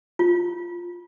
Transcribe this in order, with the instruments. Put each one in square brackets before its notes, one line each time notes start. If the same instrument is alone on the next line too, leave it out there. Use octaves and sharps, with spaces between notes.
[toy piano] F4